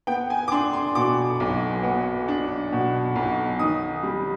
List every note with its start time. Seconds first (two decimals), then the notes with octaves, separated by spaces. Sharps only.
0.07 B3 G5
0.30 G#5
0.48 D6
0.52 D4 C6
0.73 C6
0.95 B2 D6
1.40 B1
1.83 B3
2.28 D4
2.72 B2
3.16 B1
3.59 D#3 D#6
4.03 G3